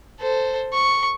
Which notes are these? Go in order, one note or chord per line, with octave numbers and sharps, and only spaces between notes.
A4 C5
C#6